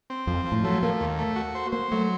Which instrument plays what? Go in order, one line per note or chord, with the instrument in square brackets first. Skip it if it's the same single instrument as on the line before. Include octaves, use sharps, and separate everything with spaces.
[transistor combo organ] C4
[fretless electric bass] F2 [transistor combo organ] F3
[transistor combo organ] F3
[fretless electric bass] A2
[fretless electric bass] F#3 [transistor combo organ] A3
[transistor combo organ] A3 [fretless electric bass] A#3
[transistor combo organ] D#2
A3
F#4
C5
[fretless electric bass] A#3 [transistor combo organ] C5
[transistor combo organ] F#3 [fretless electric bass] A3